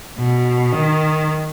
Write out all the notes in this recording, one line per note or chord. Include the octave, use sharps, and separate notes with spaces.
B2
D#3